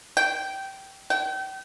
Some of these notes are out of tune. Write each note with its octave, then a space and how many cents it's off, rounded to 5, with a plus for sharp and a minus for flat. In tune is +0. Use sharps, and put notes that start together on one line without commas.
G5 -15
G5 -35